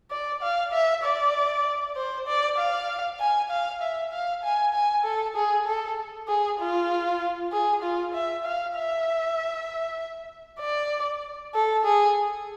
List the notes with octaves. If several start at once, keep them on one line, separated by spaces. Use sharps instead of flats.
D5
F5
E5
D5
C5
D5
F5
G#5
F5
E5
F5
G#5
G#5
A4
G#4
A4
G#4
F4
G#4
F4
E5
F5
E5
D5
A4
G#4